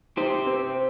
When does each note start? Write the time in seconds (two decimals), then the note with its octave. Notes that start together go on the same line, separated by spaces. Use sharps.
0.17 D#4 G4 C5
0.47 C4